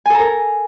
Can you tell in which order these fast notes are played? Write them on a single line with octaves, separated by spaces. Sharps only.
G#5 A4 A#5 A#4